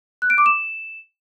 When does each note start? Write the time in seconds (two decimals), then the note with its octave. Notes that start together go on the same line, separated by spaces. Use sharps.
0.22 F#6
0.30 D7
0.38 D6
0.46 E7